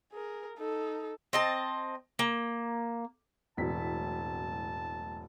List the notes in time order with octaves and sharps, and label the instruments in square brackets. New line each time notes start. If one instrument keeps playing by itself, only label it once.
[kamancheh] G#4 A#4
D#4 A4
[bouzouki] C4 D#5 A5
A#3
[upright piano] E1 B6 [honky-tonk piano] A2 F#3 C4 [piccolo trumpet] A5